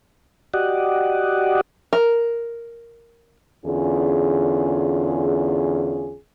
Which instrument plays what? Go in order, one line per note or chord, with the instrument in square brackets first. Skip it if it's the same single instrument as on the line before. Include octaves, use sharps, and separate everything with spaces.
[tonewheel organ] F#4 G4 D5 D#5 F#5
[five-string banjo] A#4
[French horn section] E2 D3 C#4 F4 G#4